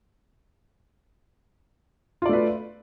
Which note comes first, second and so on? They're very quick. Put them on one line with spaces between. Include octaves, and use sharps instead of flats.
F4 D5 A3 B4